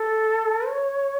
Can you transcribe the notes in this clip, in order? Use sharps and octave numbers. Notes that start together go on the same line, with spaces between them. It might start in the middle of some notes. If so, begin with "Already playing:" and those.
Already playing: A4
C#5